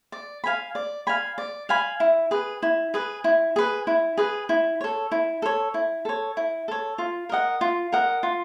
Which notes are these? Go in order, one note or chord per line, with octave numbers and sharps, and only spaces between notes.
D5
F5 G#5 B5
D5
F5 G#5 B5
D5
F5 G#5 B5
E4
G#4 B4
E4
G#4 B4
E4
G#4 B4
E4
G#4 B4
E4
A4 C#5
E4
A4 C#5
E4
A4 C#5
E4
A4 C#5
F4
A#4 D#5 F#5
F4
A#4 D#5 F#5
F4